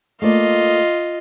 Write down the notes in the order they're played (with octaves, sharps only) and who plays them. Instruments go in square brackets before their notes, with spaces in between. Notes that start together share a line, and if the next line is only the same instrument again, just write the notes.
[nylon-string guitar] A3 A#3 D5 [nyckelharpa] F4 D#5